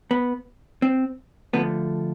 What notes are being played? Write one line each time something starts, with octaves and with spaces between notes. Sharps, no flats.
B3
C4
D3 F3 A3 B3